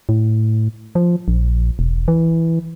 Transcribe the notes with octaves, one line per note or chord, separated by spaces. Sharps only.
A2
F3
A#1
E1
E3